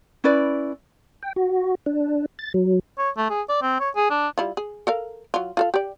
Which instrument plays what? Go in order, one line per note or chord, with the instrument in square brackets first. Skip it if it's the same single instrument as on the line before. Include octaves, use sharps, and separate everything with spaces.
[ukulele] C#4 E4 B4 D5
[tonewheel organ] G5
F#4
D4
A6
F#3
[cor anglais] C#5
A3
G#4
D5
C4
C#5
G#4
D4
[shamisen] G3 E4 F4
G#4
A4 A#4 F5
F#3 F4
F4 A4 F5
G4 D5